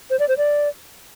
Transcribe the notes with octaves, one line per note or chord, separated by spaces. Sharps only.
C5
D5
C5
D5